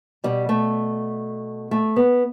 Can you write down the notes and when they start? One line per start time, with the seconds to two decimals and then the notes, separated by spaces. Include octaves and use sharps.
0.24 B2 G3
0.49 A3
1.71 A3
1.96 B3